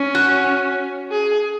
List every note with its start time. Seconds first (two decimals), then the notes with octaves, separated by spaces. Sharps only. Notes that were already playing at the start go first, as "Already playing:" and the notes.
Already playing: C#4
0.15 F#4
1.11 G#4